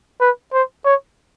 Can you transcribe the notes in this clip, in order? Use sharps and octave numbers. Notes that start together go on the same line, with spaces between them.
B4
C5
C#5